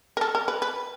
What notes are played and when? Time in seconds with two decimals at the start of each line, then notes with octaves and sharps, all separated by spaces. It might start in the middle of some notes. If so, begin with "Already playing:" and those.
0.17 A#4
0.21 A4
0.35 A#4
0.48 B4
0.62 B4